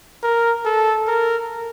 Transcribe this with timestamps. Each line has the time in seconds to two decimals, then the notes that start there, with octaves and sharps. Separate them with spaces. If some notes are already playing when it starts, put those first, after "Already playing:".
0.23 A#4
0.65 A4
1.07 A#4